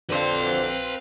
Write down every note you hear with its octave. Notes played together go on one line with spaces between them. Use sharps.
F2 D3 C4 B4 F5 C6